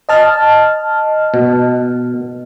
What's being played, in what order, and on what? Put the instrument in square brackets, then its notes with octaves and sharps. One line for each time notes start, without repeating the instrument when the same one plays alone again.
[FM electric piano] D#5 A5 F6
[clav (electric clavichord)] B2